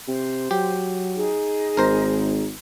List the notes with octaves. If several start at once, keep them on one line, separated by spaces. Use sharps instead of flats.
C3 C5
F#3 G4
D#4 G#4
G#1 A#4 C5 A#5